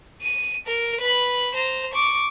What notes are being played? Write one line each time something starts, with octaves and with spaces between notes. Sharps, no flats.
D#7
A#4
B4 B5
C5 A#5
C#6 D6